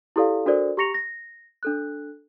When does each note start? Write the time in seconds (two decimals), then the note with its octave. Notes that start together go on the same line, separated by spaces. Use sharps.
0.16 E4 G4 A4 D5 F5
0.46 D4 F#4 A4 A#4 C5 D5
0.77 G4 A#5 C#6 A#6 C#7 F7
0.94 A#6
1.63 D4 A4 F#6